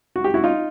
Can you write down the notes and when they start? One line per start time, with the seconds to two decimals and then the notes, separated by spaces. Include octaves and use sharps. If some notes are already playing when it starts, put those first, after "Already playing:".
0.16 F#4
0.24 G4
0.34 E4 F#4
0.44 D#4 F4